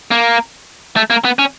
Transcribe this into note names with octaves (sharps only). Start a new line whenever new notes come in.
A#3
A3
A#3
B3
C#4